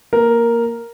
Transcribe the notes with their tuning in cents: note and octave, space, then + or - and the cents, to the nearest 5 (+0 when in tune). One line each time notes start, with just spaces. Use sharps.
A#3 +0 A#4 +0